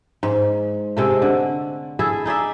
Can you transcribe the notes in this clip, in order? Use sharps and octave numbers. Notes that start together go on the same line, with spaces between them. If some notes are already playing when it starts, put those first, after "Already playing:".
G#2
C3 G#3 A3
D3
E4 G#4 A4 E5
D#4 G#4 D5 E5